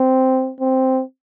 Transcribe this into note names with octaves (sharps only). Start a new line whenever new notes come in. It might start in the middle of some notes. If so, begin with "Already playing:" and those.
Already playing: C4
C4